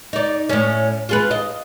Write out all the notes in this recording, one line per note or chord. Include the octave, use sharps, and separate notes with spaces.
D#4 D5
A2 C#4
F4 G#4 B4
D#5